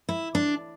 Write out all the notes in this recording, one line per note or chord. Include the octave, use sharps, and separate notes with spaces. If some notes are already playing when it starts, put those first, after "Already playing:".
E4
D4